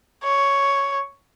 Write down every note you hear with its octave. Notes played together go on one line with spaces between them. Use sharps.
C#5